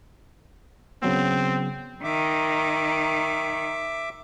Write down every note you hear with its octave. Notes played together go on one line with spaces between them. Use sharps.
C#3 F#3 B3 C4
D#3 E5 D6